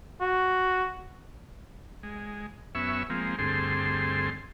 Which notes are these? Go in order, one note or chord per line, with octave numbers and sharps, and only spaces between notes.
F#4
G#3
F#2 B3 C#4 E5 C#6 E6
F3 G#3 A#3 C4
D2 G2 C4 G#4 A4 C6